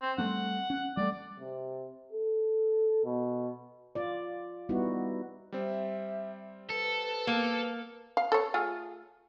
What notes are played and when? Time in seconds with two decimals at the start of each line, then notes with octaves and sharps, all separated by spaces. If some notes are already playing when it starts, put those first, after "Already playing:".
0.02 C4
0.18 G3 A3 C4 F#5
0.70 C#4
0.97 G3 A3 D5
1.39 C3
2.12 A4
3.05 B2
3.95 F4 D5
4.69 G3 B3 D#4 E4 F#4
5.52 G3 C4 E5
6.69 A4 B4
7.27 A#3
8.17 F5
8.32 A4 C#5
8.54 A3 F4 G#4